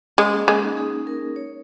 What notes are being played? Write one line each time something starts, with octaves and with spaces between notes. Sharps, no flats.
G#3 C#4
A#3
G#3 C#4
D#4
G#4
A#4
C#5